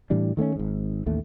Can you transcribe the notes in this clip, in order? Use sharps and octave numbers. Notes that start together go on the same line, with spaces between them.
A2 E3 G3 D4
D#3 A3 A#3 C#4
G#1 G#2
A1 D#2 A3